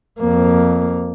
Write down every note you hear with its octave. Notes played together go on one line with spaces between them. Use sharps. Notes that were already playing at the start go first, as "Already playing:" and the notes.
F2 A#3